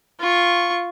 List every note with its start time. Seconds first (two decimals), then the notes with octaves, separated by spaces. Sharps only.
0.20 F4 C#6